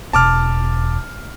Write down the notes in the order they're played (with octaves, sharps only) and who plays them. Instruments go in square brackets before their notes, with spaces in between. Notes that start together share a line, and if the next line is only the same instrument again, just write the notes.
[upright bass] E1 [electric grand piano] A5 D6 F6